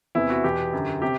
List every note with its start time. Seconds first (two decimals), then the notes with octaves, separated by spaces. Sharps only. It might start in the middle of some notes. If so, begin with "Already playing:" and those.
0.15 E2 C3 E3 E4
0.30 F#4
0.44 E2 B2 G4
0.73 F#2 D3
1.02 C3 G4